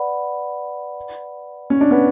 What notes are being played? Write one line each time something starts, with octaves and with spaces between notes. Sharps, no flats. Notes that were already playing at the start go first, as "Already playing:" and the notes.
Already playing: B4 D5 F#5 B5
C#4
D4
B3 C#4